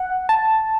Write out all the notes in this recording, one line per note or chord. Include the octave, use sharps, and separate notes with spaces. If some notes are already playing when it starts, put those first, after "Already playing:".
Already playing: F#5
A5